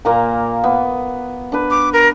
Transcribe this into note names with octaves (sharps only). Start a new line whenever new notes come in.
A#2 A#3 A#5
B3
D4 B4
D6
A#4